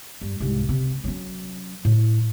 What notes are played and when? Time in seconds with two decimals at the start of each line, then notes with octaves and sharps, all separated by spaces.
0.21 G2
0.40 C2 G#2
0.69 C3
1.04 F#3 C#4
1.85 A2